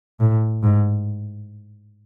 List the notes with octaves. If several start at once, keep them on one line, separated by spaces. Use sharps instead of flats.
A2
G#2